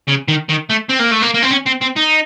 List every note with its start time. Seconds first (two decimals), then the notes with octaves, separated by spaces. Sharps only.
0.08 C#3
0.28 D#3
0.49 D#3
0.70 A3
0.90 C4
1.00 A#3
1.12 A3
1.22 A#3
1.34 A#3
1.42 C4
1.51 C#4
1.66 C4
1.81 C4
1.96 D#4